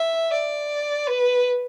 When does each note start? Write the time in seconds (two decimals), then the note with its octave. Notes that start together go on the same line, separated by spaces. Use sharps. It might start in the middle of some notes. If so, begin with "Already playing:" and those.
Already playing: E5
0.32 D5
1.07 B4